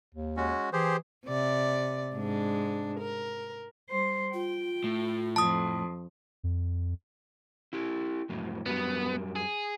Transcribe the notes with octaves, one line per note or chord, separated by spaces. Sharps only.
D#2
G#3 C#4 F#4
E3 G4 G#4 C5
C3 D5
G#2 G#3 D4
A#4
G3 C5
F4 G5
A2
F2 A5 D#6
F2
E4 G4
F2 A2 F#3
F#2 F#3 G3 B3
G#4